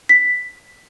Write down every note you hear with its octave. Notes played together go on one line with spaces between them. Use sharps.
B6